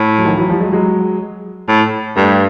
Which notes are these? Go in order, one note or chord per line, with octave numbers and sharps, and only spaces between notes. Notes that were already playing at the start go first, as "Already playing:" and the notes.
Already playing: A2
F#3
D#3 F3
E3 F#3
F3 G3
F#3 G#3
F#3 G#3
A2
G2 G3 A3